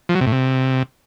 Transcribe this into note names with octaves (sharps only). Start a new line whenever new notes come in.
F3
F#3
C3
A2
C3